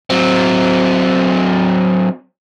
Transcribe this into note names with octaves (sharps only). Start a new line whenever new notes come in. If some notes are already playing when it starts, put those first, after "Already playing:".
F#3 C4